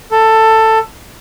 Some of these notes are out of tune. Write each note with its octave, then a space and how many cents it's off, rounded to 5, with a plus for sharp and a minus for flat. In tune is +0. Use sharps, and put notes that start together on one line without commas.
A4 +15